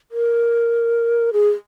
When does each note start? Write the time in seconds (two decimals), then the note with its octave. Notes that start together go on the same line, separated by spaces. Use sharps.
0.11 A#4
1.33 G#4